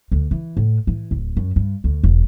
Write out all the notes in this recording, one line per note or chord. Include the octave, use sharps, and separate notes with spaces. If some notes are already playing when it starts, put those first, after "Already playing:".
D2
E3
A2
E3
D1
F#2
G2
D2
E1